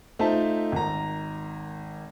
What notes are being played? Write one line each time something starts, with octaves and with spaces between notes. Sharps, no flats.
A3 D#4 F4 C5 E5 A5
G#1 A#5